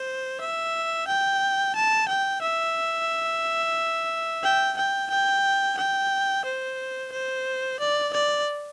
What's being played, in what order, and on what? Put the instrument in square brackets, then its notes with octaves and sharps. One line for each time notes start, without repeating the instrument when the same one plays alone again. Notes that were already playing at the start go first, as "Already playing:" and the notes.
Already playing: [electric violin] C5
E5
G5
A5
G5
E5
G5
G5
G5
G5
C5
C5
D5
D5